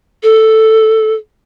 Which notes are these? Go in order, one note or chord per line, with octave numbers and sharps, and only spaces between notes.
A4